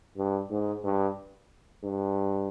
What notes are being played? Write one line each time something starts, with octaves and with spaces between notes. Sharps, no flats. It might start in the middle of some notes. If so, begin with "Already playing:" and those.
G2
G#2
G2
G2